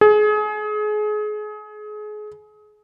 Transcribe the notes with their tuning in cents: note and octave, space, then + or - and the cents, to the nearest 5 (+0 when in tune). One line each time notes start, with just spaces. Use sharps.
G#4 +30